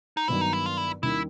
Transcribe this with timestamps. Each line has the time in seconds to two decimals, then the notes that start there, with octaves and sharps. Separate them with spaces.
0.17 D#4
0.28 G2 D#3 F#3 B3 E4
0.41 D#4
0.53 E4
0.66 F4
0.77 E4
1.03 D#2 D#3 G3 A#3 C#4 E4